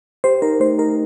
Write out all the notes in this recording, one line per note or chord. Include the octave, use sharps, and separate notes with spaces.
G4 C5
D#4 A#4
A3 C5
D#4 A#4